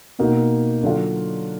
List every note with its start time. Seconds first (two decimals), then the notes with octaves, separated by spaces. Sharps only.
0.19 B2 A#3 D#4 F#4
0.83 D3 F#3 D4 F4